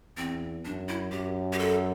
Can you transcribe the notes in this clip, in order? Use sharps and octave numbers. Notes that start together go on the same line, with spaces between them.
E2 C4
F#2 D4
E4
F#2 G4
G4
A4